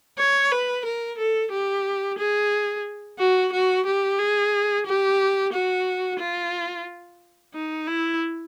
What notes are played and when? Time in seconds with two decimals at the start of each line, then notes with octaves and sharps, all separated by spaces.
0.18 C#5
0.51 B4
0.85 A#4
1.18 A4
1.52 G4
2.18 G#4
3.19 F#4
3.52 F#4
3.86 G4
4.19 G#4
4.86 G4
5.53 F#4
6.19 F4
7.54 D#4
7.87 E4